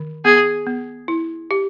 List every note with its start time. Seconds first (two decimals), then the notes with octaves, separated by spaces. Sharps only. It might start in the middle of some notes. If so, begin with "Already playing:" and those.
Already playing: D#3
0.25 B3 G#4
0.67 B3
1.08 E4
1.51 G4